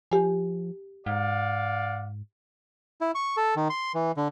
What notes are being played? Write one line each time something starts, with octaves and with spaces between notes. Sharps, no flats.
F3 G4 G#5
G#2 D5 F5 F#5
E4
C#6
A4
D#3
C6
E3
D3